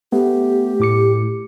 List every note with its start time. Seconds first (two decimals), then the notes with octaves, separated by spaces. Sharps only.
0.12 A3 B3 G4
0.80 A2 D6 C#7